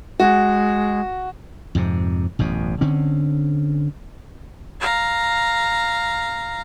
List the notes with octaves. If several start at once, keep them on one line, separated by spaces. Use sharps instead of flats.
G#3 F#4
F2 G#2 C3
A1 F#2 B2
D3 C4 C#4
F5 A#5